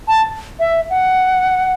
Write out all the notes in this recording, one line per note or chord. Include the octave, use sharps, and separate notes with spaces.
A5
E5
F#5